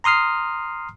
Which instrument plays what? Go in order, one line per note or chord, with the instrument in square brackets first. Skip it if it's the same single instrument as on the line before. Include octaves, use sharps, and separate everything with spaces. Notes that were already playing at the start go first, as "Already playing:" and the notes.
[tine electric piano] A#5 C6 D#6 F6 C7